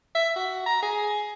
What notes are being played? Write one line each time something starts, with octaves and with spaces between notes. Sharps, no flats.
E5
F#4
A#5
G#4